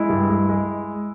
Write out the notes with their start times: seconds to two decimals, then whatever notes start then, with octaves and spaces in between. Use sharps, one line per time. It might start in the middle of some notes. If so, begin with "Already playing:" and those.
Already playing: G#3 E4
0.09 G2
0.29 G#3
0.49 G#3